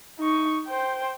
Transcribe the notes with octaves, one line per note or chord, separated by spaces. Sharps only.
D#4 C#6
C5 G5